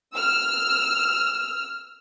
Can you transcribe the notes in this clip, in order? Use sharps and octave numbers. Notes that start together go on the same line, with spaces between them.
E6 F6